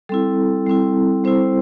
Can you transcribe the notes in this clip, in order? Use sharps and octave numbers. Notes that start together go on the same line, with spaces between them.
G3 C4 E4 A4
G3 C4 E4
G3 C4 E4 C5